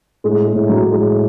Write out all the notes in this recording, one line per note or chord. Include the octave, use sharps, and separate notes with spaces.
A2 G#3
G#3
A2
F#3
A2
G#3